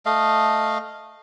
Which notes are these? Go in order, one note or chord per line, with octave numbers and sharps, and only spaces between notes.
A3 D#5 F5